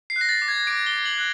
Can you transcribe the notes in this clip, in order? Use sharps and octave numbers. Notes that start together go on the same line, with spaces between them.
C7
F#6
A#6
A6
D6
G#6
D6 D7
G7
D6
F#7
F#6